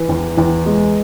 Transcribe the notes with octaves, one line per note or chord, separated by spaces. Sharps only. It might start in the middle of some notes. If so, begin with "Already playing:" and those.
Already playing: E3 B4
E2
E2
G#3